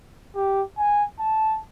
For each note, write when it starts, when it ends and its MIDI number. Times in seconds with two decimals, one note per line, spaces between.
0.36 0.62 67
0.79 1.03 80
1.20 1.56 81